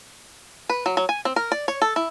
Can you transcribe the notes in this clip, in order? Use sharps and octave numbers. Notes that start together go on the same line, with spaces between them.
B4
F#3
F#3
G#5
C4
A#4
D5
C#5
A4
E4